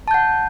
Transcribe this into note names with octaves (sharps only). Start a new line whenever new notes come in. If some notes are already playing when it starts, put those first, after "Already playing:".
F#5 A5 G6